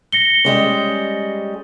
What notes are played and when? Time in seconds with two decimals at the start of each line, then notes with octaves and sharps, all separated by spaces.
0.12 A#6 C#7 G7
0.45 G3 G#3 C#4